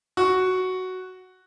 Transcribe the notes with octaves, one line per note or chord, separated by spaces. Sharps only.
F#4